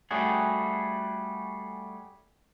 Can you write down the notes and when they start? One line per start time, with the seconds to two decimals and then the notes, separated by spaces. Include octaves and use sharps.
0.11 G3 A3 C#4 F#4 G#4